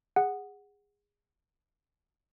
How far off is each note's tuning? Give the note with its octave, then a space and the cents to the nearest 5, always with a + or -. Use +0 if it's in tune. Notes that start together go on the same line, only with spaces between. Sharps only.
G#4 -20 F#5 +0